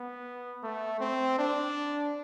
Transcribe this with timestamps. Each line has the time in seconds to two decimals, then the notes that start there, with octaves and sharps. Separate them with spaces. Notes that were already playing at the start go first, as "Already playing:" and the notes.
Already playing: B3
0.63 A3
1.00 C4
1.38 D4